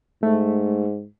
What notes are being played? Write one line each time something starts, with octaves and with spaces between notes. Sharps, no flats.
G#2 A3